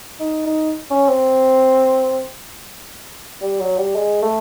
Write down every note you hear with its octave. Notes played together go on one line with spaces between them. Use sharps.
D#4
D#4
C#4
C4
G3
F#3
G3
G#3
A3